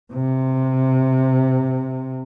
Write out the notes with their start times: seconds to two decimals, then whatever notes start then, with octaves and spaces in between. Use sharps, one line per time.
0.13 C3